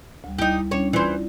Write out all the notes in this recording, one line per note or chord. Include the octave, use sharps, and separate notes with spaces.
D2 G3
G3 D#4 E4 G4
G3 C#4 D4 C#5
E3 E4 F4 C5 D5